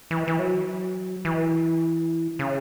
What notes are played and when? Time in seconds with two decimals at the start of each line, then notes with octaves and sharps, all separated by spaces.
0.11 E3
0.28 E3
0.39 F#3
1.25 E3
2.39 C#3